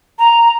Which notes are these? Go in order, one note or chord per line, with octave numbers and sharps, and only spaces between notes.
A#5